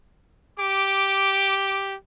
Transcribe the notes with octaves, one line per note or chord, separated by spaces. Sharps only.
G4 D6